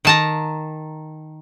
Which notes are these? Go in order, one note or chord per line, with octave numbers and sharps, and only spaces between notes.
D#3 A5 A#5